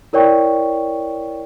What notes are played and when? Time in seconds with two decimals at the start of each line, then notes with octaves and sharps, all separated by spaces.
0.13 E4 A#4 C#5 D5 G5 C#6